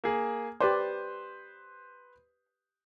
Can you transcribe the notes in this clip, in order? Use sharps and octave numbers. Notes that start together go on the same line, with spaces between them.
A#3 G#4
G4 B4 C5 D5